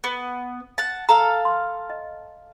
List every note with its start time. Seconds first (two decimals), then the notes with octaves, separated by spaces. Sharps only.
0.04 B3
0.78 F#5 A5
1.09 A4 F5 A#5
1.45 C6
1.90 D#5